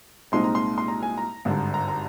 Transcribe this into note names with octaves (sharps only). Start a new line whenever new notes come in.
C2 A#2 G#3 C4 D#4 C6
A#5
C6
C6
A#5
G#5
A#5
G#1 G2 D3
A#5
A#5